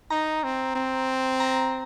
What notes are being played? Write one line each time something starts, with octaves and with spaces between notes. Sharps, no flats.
D#4 A#5
C4
C4
A#5